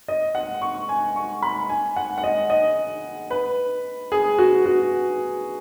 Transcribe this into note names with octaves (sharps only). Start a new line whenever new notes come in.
D#5
F#5
C#6
G#5
C#6
B5
G#5
F#5
F#5
D#5
D#5
B4
G#4
F#4
F#4